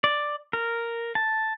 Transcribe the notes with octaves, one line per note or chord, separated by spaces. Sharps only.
D5
A#4
A5